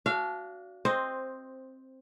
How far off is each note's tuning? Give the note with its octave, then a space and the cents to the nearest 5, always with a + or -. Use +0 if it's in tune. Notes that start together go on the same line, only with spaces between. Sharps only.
D4 -30 F#4 +0 F5 -30
C4 +10 C5 +0 D#5 +0